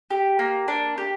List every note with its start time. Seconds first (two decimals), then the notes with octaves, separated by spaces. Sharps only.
0.11 G4
0.39 A#3
0.68 D4
0.98 G4